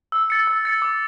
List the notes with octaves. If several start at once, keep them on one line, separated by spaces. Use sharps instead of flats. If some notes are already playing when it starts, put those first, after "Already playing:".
E6
A6 C#7
E6
A6 C#7
D6